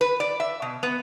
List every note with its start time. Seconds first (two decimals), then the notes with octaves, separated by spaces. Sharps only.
0.01 B4
0.20 D5
0.40 E5
0.62 B2
0.83 B3